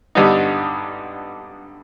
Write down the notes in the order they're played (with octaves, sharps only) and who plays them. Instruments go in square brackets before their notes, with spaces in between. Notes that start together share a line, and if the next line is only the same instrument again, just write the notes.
[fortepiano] G2 D3 G3 B3 D#4